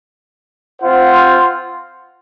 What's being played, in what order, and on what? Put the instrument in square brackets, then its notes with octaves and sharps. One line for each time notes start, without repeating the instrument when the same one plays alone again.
[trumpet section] C4 F4 C5 F#5